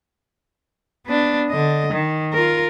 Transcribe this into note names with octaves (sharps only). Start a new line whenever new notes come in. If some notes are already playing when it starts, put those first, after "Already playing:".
B3 D4
D3 D#5
D#3
F4 A#4